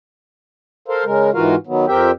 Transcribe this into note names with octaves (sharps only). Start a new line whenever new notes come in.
A4 A#4 C5 F5
C#3 G#3 A#4
G#2 E3 F4 F#4 A#4 F5
D#3 F#3 B3
F2 C4 G4 A#4 E5 G5